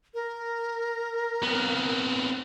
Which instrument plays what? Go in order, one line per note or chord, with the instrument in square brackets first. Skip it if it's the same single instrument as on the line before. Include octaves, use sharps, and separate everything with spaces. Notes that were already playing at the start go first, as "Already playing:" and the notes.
[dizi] A#4
[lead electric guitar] B3 C4